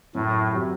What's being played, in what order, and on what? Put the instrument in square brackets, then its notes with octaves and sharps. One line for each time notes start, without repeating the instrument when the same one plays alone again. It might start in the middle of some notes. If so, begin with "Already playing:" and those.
[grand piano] F#2 [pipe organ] A2
[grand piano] F#3 C4 G4